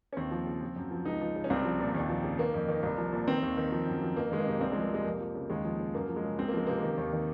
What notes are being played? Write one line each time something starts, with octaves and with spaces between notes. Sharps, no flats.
C#4
D#2 C4
F3
C#3
F3
F#2
F3
C#2 D#4
F3
C#3
C#4
C2 C4
F3
A#2
D#2
F3
C#3
D#3 A#3
F2
D#3
C2
F3
A#2
D#3 C4
D#2
D#3
F3
F#2
F3
F2 A#3
D#3 G#3
A#3
C3
C2 C4
F3 G#3
A#3
C3 G#3
F2 A#3
F3
C#3
D#2 G#3
F3
C#3
F#2 A#3
F3
G#3
C#3
C#2 C4
A#3
F3 G#3
C3 A#3
D#3
D#2
D#3